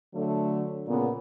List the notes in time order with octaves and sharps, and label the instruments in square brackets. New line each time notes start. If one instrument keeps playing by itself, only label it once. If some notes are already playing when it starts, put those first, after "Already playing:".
[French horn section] D3 F#3 A3
A#2 C#3 B3